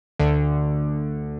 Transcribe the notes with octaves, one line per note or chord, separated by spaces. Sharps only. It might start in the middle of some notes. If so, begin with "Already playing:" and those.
D2 D3